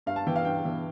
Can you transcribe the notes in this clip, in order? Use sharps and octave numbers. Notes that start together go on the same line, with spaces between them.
G2 F5
A5
E3 G5
F5
G2 G5
E3